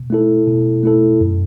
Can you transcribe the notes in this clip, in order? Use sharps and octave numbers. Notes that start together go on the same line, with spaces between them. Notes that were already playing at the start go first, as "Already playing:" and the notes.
Already playing: B2
A3 E4 A4
B2
A3 E4 A4
F#2